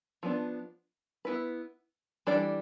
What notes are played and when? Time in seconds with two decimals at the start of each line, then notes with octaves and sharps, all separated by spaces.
0.23 F3 B3 D4
1.25 B3 E4 B4
2.27 E3 G3 D4 A4 D5